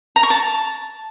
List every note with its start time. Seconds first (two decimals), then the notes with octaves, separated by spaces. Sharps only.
0.16 A#5
0.23 C#6
0.30 A5